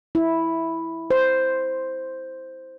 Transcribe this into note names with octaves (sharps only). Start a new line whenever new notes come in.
E4
C5